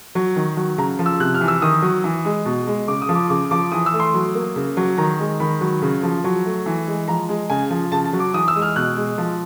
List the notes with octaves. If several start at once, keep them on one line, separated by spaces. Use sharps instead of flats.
F#3
D#3
F#3
C#3 A#5
F3
E6
C3 F#6
F6
E3
E6
D#3 D#6
F#3
E3
G#3
B2
G#3
C#3 D6
D#6
F3
D6
C#3 D6
F3 D6
E3 D#6
E6
A3
C6
F#3
A#3
C#3
F#3
D#3 A#5
G#3
D#3 B5
F#3
C#3
F3
F#3
A3
E3
G#3
F3 A#5
G#3
C#3 G#5
F3
C#3 A5
A5
F#3
D6
E3 D#6
E6
G#3
F6
B2 F#6
G#3
F3